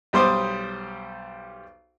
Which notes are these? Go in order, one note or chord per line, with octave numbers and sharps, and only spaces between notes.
B1 G3 C5 C6 D6 D#6